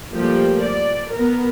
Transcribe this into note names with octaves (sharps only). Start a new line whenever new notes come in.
F3 G3 A3 A#3 G4
D5
B3 A#4